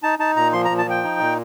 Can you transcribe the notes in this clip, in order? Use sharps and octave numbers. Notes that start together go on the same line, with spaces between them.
D#4 A5
D#4 A5
A#2 A#5
F3 C6
A#5
A#2
A5
F3 G5
D#4
A#2